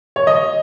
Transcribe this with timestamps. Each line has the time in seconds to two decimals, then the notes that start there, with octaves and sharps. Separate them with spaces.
0.16 C#5
0.27 D#5